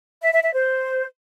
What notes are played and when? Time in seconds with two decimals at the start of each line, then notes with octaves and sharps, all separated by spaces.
0.22 E5
0.32 E5
0.43 E5
0.54 C5